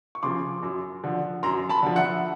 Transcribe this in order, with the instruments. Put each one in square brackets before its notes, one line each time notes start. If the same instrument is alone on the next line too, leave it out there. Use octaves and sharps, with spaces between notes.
[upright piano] C#6
C#3 F3 C6 D6
F#2
D3 F3
F#2 A#5 C6
A5 B5
D3 F3
E5 F#5